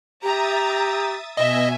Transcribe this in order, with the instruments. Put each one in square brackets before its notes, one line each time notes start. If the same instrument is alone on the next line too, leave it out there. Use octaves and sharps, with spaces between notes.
[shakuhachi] G4 [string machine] E5 D#6 A6 [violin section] A#5
[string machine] B2 G#5 [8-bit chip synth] D#5 [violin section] E5